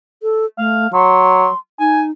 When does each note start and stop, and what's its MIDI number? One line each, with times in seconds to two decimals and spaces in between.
0.23 0.45 69
0.58 0.87 57
0.58 0.87 77
0.93 1.47 54
0.93 1.57 84
1.80 2.11 63
1.80 2.01 80